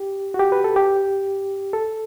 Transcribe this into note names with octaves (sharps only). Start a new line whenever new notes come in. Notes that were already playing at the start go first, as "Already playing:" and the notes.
Already playing: G4
F#4
G4
B4
A4
G4
A4